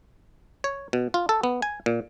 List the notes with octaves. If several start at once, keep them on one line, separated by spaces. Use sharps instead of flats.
C#5
B2
F4
A4
B3
G#5
A#2